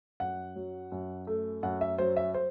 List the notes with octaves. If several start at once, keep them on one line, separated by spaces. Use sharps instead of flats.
F#2 F#5
F#3
F#2
A3
F#2 F#5
E5
F#3 C5
E5
C5